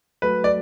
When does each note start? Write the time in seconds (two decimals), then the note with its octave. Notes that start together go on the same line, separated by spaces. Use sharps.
0.22 F#3 A3 F#4 A4 B4
0.44 D5